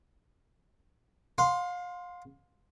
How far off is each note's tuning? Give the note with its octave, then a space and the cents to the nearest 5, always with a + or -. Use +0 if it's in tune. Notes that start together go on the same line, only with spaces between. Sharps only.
F5 +35 C6 +0